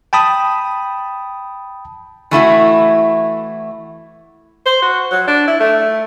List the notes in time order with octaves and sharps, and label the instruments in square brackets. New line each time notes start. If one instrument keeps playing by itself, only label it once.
[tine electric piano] G5 A5 B5 D#6
[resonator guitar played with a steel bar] E3 A3 E4 F#4
[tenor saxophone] C5
F#4
F#3
D4
E4
A3